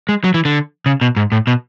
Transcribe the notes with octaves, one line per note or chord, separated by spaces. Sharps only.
G#3
F#3
E3
D3
C#3
B2
G#2
A2
B2